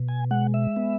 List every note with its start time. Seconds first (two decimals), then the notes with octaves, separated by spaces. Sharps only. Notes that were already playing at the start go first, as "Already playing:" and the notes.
Already playing: B2
0.09 G#5
0.31 G#3 F#5
0.54 E5
0.76 B3